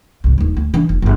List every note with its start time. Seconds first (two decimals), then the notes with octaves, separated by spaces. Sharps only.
0.24 C2 G#2
0.38 D1 D#2
0.57 D2
0.74 E3 D4
0.89 F1
1.02 G1 G#2